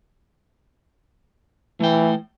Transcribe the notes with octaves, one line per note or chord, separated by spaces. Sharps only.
E3 A3 G5